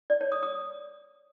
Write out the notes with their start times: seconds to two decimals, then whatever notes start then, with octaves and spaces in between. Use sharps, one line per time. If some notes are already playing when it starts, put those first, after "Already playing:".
0.10 D5
0.21 C#5
0.32 D#6
0.43 D#6